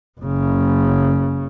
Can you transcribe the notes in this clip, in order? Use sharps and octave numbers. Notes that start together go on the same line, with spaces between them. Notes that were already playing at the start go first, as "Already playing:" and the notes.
F#1 C#3